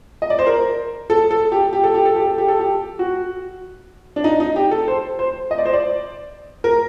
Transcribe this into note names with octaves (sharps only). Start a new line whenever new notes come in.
D#5
D5
C5
A#4
A4
A4
G4
G4
A4
G4
A4
G4
A4
G4
A4
G4
F#4
D4
D#4
D#4
G4
A4
C5
C5
D#5
D5
C5
D5
A#4